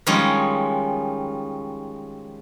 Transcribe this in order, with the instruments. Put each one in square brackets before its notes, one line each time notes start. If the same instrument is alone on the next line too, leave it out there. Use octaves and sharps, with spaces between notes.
[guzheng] D#3 F3 G3 G#3 C#4